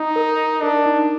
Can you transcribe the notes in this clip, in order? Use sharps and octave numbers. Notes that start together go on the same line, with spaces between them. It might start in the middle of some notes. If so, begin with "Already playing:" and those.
Already playing: D#4
A#4
A#4
D4 A#4
D#4